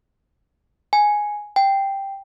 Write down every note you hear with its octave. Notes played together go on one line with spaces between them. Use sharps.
G#5
G5